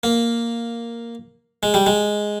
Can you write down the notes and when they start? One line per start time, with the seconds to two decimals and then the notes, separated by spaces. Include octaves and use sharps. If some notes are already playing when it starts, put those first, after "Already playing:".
0.03 A#3
1.63 G#3
1.74 G3
1.86 G#3